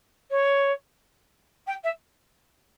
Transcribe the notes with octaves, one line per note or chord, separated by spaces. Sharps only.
C#5
G5
E5